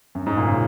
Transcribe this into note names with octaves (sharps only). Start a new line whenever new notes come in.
F#2
G#2
A#2
C#3